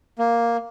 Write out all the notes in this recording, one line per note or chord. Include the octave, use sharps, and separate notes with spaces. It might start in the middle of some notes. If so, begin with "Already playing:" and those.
A#3